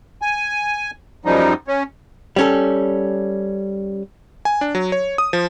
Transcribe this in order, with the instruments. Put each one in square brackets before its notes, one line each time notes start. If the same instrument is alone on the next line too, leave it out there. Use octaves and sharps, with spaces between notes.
[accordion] G#5
F#2 F3 G3 D#4
C#4
[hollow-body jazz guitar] G3 C#4 A4
[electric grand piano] G#5
D4
F#3
C#5
D#6
F3